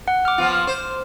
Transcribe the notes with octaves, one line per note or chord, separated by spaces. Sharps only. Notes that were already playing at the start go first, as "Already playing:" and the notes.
F#5
D6 F6
F3 B3 F4
C5